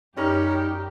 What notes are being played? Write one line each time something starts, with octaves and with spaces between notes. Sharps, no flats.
F#2 G3 C#4 D#4 G4 A#4